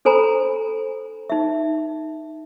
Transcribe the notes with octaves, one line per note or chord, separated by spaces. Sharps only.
D4 A4 C5 G#5 A#5 B5
D#4 E5